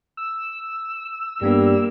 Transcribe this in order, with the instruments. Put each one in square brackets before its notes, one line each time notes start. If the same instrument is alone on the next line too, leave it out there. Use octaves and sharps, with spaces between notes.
[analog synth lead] E6
[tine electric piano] G2 B3 D4 [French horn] G3 [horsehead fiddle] A#3